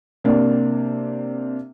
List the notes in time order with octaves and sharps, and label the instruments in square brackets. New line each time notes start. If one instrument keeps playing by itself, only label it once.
[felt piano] C3 A#3 D4